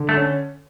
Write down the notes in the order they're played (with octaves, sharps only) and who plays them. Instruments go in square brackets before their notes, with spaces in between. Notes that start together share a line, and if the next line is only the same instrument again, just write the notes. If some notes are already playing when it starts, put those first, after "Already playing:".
Already playing: [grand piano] D3
[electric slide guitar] A3
[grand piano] C#4